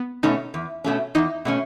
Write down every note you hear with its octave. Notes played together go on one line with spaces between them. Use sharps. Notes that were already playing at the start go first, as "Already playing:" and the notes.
Already playing: B3
B2 A3 C#4 D#4
E2
B2 A3 C#4
E2 D#4
B2 A3 C#4